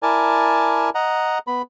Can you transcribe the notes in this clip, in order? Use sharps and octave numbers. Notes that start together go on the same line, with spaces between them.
E4 A#4 D5 G#5 A5
D#5 F#5 A#5
B3 B5